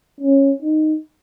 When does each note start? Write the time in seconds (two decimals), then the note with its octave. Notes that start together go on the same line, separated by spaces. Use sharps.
0.20 C#4
0.62 D#4